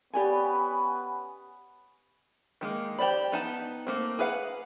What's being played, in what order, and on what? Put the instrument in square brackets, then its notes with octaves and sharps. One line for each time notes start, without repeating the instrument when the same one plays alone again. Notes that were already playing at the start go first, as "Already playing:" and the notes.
[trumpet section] B3 C#4 B4 [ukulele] G4 D5 G#5
[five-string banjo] D#3 G#3 A#3
G4 C5 D5 B5
B3 D#4 A5
A3 A#3 C4
G#4 B4 F5 F#5